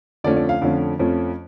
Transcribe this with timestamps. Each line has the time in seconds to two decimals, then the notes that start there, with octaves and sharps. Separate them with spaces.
0.24 F2 D3 F3 A3 C#4 D5
0.37 D5
0.49 F5
0.61 F2 D3 F3 A3 C#4
0.99 F2 F3 A3 C#4